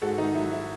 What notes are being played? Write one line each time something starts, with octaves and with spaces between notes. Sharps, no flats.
G#2 F#4 A4
D#3 D#4
F#3 E4
E4